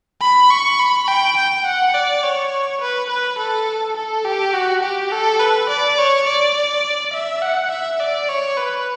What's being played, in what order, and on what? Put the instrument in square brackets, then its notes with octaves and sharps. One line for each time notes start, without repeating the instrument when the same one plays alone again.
[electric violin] B5
C#6
B5
G5
G5
F#5
D5
C#5
B4
B4
A4
A4
G4
F#4
G4
A4
B4
D5
C#5
D5
E5
F#5
E5
D5
C#5
B4